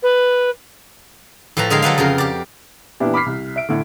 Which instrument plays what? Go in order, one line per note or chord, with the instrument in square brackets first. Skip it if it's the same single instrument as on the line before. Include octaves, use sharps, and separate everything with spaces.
[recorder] B4
[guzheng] A2 F3 B4 A5 A#5
D3 G#3 G#4 A#4 F5 G5
F#3 A4 B4 F5
F2 C#3 A#4 C6
G4 D5
[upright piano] A#2 E3 B3 D4 E4 G4
B5 D6 F6 B6 C7
C2
E5 D7
A2 D3